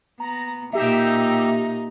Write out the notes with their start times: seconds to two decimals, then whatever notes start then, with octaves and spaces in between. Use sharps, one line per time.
0.20 B3 A#5
0.73 A#2 D#4 G4 E5